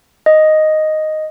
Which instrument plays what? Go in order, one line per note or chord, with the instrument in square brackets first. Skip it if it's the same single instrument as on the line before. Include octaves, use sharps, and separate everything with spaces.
[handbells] D#5